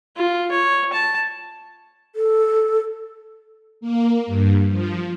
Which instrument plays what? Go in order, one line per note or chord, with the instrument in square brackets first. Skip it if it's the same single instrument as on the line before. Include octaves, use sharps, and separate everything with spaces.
[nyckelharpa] F4
C#5
A5
[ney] A4
[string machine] A#3
G2
F3